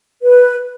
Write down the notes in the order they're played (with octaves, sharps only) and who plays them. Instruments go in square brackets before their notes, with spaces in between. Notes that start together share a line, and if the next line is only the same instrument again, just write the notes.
[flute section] B4